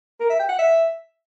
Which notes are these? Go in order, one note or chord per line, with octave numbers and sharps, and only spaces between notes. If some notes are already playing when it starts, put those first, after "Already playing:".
A#4
E5
G5
F#5
E5